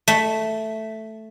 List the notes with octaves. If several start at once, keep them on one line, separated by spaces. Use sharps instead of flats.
A3